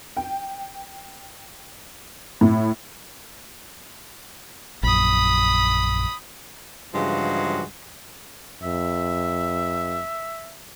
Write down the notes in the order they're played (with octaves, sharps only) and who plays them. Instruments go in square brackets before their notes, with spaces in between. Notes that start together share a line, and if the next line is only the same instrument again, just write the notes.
[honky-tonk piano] G5
A2
[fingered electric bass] A#1 F#2 [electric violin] B5 D#6
[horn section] G2 C#3 E3 F3 G#3 F#4
[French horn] F2 [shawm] E5